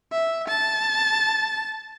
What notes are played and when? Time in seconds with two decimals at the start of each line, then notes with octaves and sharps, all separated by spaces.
0.12 E5
0.48 A5